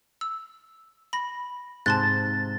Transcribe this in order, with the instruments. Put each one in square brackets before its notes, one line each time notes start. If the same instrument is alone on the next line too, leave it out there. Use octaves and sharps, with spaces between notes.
[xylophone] E6
B5 A#6
[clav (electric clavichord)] G#2 C3 [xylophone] A5 C6 F#6 [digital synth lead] A6